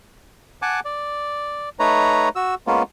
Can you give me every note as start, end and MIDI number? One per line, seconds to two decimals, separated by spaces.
0.62 0.80 78
0.62 0.80 80
0.62 0.80 81
0.62 0.80 86
0.85 1.69 74
1.79 2.29 57
1.79 2.29 63
1.79 2.29 71
1.79 2.29 73
1.79 2.29 82
2.36 2.55 66
2.36 2.55 88
2.67 2.83 56
2.67 2.83 58
2.67 2.83 59
2.67 2.83 61
2.67 2.83 65